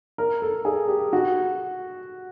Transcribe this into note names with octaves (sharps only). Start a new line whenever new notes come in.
A#4
A4
G#4
G4
F#4